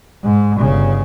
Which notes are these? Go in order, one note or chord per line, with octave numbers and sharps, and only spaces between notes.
G#2
G1 C#3